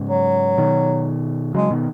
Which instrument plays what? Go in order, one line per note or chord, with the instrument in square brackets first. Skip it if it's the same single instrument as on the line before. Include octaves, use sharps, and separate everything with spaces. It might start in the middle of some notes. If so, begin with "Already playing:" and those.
Already playing: [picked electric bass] G#2 C#3
[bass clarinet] F#3
[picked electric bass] B2 D#3
[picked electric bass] C#3 F#3 [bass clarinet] G#3
[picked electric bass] B2 D#3